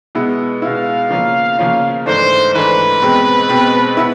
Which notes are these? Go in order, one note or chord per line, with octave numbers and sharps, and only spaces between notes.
B2 G#3 B3 E4
B2 G#3 B3 E4 F5
C#3 F3 A#3 C#4 F4
C#3 F3 A#3 C#4 F4
G#2 E3 A3 D4 C5
G#2 E3 A3 D4 B4
B2 G#3 C4
B2 G#3 C4
B3 E4